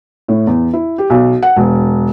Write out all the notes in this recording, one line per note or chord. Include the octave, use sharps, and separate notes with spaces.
A2
E2
E4
G4
B1
F#5
E1